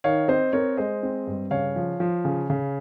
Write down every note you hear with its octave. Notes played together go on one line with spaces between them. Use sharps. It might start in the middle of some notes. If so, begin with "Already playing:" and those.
D#3 C#5 F5
C4 C5 D#5
C4 A#4 C#5
G#3 C5 D#5
C4
G2
C#3 C#5 F5
F3
F3
C#3
C#3